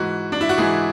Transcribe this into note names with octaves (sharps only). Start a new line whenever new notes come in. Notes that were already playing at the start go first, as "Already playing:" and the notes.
Already playing: G#2 E3 F#4
D4
E4
F#4
G#2 E3 G#4